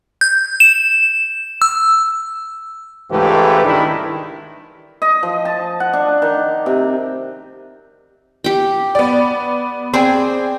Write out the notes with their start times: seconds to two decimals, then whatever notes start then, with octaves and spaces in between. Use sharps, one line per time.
0.21 G6
0.60 E7
1.62 E6
3.11 C#2 G#2 E3 A3 G4 B4
3.64 C2 D#3 D4 E4
5.02 D#5
5.23 F3
5.45 A5
5.80 F#5
5.93 D4
6.22 D#3
6.66 C3
8.44 G4 G5
8.95 B3 D5
9.94 C4 G#4 C5 D5 G5